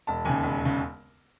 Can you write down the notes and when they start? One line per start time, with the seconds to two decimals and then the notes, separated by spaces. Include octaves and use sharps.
0.07 E1 A5
0.25 D#2 C#3 G#5
0.43 E1
0.65 C#3